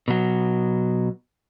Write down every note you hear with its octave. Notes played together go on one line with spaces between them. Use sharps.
B2 F#3